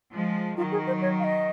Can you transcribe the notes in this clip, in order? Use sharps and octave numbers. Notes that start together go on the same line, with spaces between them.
F3 G#3
D#3 F#3 F4
G#4
C5
C#5
F5
D#5